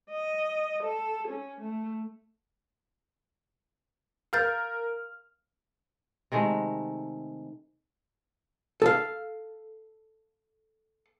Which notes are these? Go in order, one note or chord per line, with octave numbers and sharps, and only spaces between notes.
D#5
A4
C#4
A3
A#4 F5 F6 G6 A6
C3 D#3 G#3 A3
A4 F5